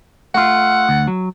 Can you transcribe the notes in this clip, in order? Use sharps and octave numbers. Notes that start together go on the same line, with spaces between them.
A3 F4 F#5
D2
F#3